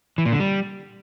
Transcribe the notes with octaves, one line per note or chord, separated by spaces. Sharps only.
E3
A#2
D3
G3